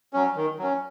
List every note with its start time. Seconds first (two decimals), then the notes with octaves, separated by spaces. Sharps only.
0.13 F#3 C#4
0.36 D#3
0.59 F#3 C#4